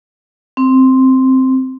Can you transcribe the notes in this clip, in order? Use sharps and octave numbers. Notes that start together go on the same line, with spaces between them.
C4